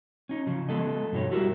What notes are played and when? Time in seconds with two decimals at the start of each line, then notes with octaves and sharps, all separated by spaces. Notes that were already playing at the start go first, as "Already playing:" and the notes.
0.29 C#4 D#4
0.47 C#3 F3
0.69 G#3 B3 A4 D#5
1.12 G2 B2 G3 D#4 C#5
1.31 E4 F#4 G4 A#4 D5 E5